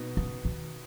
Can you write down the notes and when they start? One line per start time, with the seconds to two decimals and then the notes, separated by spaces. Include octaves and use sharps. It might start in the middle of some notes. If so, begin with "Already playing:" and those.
Already playing: B2 B3 D#4
0.17 C#3
0.45 D#3